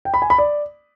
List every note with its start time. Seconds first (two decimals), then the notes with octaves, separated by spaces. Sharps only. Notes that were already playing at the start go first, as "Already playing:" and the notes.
0.05 G5
0.14 B5
0.22 G#5
0.30 B5
0.38 D5